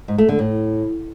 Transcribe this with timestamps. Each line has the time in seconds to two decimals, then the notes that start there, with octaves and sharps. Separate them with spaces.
0.08 G#2
0.18 A3
0.29 D3
0.39 A2